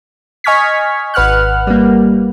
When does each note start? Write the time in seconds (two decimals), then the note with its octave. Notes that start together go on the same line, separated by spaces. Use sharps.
0.44 D#5 G#5 C#6 F6 G#6 B6
1.14 G#1 B4 F#5 F6 F#6
1.67 G3 A#3